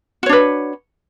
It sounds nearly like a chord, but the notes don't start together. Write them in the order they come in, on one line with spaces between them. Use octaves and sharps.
F#4 C#5 D4 B4